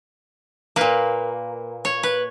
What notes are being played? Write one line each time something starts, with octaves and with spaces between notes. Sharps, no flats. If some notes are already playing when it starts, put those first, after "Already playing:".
A#2 A#3 B4
C#5
B4